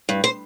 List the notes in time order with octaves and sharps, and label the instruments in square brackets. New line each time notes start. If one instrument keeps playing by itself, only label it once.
[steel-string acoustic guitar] G2
C5